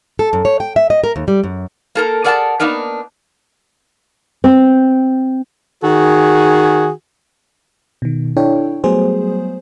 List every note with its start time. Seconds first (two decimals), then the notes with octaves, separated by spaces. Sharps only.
0.19 A4
0.33 F#2
0.45 C#5
0.60 G5
0.76 E5
0.90 D#5
1.04 A#4
1.16 D#2
1.28 G3
1.44 F#2
1.95 A#3 A4 A#4
2.24 G#4 A#4 D5 F#5 G#5 A5
2.60 A#3 B3 D4 D#4 A#4
4.44 C4
5.84 D#3 F#4 G#4
8.02 B2 D#3
8.37 D4 E4 A4 C#5 G5
8.84 F#3 G3 A3 B3 G#4 C5